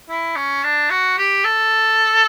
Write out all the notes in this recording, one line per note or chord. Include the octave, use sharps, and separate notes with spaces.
E4
C#4
D4
F#4
G4
A4